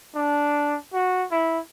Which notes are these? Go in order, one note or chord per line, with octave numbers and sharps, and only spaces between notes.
D4
F#4
E4